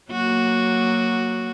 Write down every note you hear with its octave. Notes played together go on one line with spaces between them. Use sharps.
F#3 A#3 F#4